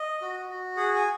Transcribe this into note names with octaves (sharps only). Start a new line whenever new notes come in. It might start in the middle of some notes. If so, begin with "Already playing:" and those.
Already playing: D#5
F#4
F#4
G#4 F#5
G#5